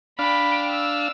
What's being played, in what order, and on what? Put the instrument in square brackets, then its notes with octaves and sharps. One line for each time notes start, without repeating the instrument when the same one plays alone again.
[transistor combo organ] D4 F5 [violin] G5 B5
[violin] E6